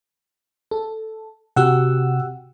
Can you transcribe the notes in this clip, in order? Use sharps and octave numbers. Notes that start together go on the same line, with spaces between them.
A4
C3 F#4 G4 F#5 E6